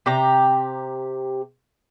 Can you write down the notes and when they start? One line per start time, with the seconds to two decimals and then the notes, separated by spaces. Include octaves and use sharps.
0.06 C3 G4 A#5